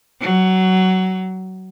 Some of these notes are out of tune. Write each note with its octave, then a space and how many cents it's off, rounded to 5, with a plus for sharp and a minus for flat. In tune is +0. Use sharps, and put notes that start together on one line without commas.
F#3 +15